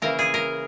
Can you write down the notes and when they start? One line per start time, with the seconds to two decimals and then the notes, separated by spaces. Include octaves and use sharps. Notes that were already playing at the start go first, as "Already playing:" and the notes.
0.02 C#3 E3 A#3 A#4
0.19 G#4
0.34 A#4